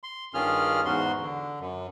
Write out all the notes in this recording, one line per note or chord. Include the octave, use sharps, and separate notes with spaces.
C6
G2 D#3 C#4 F4 G#4 F6
E2 G#2 F#4 C6
D3
F#2